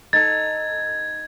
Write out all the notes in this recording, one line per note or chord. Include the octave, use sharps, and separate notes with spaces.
D#4 A4 G#6 A6